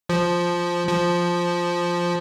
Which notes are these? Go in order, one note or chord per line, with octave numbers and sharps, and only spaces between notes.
F3
F3